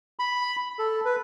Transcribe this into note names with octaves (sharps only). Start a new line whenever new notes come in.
B5
A4
B4